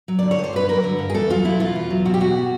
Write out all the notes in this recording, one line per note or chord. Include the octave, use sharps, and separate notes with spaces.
F#3
D3 D5
C#5
G2
C5
G2 B4
F#3 A#4
D3
G2
G#4
E2 A4
F#3 F4
B2 E4
E2 F4
E2
F#3
B2 F#4
G4
E2 F#4